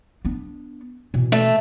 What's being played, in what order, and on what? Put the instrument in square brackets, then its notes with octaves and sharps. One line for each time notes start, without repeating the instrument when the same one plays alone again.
[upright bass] B3 D4
B2 E3
[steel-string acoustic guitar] A3